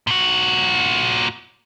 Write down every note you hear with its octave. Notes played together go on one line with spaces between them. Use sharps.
A#2 F#4